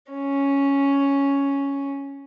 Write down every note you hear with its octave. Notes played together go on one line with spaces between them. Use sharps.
C#4